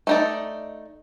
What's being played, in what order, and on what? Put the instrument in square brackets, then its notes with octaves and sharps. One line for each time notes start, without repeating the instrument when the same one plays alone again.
[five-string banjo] A3 D#4 D5